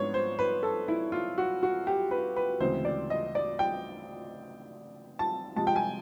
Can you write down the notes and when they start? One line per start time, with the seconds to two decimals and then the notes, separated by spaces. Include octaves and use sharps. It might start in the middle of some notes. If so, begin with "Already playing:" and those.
Already playing: G#2 F3 G#3 B3 D4 C#5
0.14 C5
0.39 B4
0.63 A4
0.88 E4
1.12 F4
1.38 F#4
1.63 F#4
1.87 G4
2.11 B4
2.36 B4
2.60 D2 C#3 E3 G#3 C4 C5
2.85 D5
3.10 D#5
3.35 D5
3.59 G5
5.19 A5
5.56 C3 F3 G#3 A5
5.67 G5
5.76 G#5